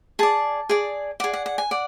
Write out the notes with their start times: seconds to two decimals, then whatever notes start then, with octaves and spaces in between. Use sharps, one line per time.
0.19 G#4 D5 A5
0.69 G#4 D5
1.20 G#4 D5 F#5
1.33 F#5
1.46 F#5
1.58 G#5
1.71 D5 F#5